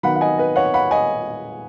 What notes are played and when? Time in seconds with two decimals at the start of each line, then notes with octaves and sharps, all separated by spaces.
0.03 D#3 F#3 B3 F#5 B5
0.15 F#5
0.21 D#5 G#5
0.38 B4 D#5
0.56 C#5 F#5
0.74 F#5 B5
0.91 D#5 G#5